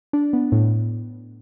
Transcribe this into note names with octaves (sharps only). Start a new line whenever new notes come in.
D4
B3
A2